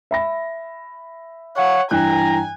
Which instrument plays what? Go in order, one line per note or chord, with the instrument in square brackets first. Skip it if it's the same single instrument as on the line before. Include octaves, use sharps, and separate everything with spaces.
[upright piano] E5 B5 A#6
[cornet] C#5 [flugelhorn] F5 [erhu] F#5
[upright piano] G2 E3 F#6 [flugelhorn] G5 [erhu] G#5 [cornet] A#5